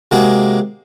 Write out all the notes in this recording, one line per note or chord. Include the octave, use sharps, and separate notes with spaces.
C3 G#3 A#3 F#4 G#4